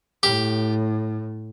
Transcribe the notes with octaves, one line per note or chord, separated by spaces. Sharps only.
A2 G4